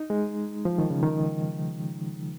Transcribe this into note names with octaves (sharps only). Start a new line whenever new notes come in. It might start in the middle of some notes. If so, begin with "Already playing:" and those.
Already playing: D#4
G#3
F3
D#3
C#3
D#3